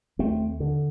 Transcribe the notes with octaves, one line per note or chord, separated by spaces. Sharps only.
D#2 A3 C4
D3